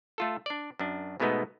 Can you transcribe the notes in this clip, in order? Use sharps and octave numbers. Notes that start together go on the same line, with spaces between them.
A3 F4 A4
D4 D5
F#2 D4
G#2 B2 G#3 A3 B3 D#4